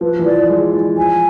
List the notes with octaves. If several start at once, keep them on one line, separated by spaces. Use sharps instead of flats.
F3 B4
E3
F3 D5
G#3
E3
F3 G#5